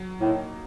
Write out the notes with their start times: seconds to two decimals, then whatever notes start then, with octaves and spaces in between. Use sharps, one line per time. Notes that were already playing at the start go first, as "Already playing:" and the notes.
Already playing: F#3
0.21 A2 A#3 D#4